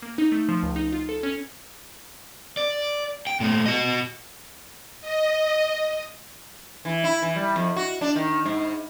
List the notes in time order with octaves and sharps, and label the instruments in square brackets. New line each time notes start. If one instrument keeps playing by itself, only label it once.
[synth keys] A#3
D#4
A3
F3
C#2
D#4
F4
A4
C#4
[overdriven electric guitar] D5
G5
A#2 A3
F#4 D#5
[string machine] D#5
[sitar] E3
E4
E3
G3
F2
F#4
D4
D#3
G#2